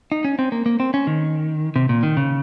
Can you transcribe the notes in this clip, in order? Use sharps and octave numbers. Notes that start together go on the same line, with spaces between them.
D#4
C#4
C4
A#3
A#3
C4
C#4
D#3
C3
A#2
D#3
C#3